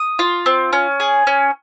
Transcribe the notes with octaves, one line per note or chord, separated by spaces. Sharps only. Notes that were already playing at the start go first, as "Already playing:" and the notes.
Already playing: D#6
F4
C4
C#4
G#4
C#4